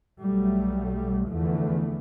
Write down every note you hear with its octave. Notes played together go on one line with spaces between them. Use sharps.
B1 F#3 G3 A3
E2 D3 E3 F3 A3